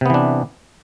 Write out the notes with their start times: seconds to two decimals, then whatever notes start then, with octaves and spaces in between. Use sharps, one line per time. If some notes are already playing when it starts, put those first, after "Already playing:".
0.01 C3
0.06 B3
0.10 E3
0.14 D4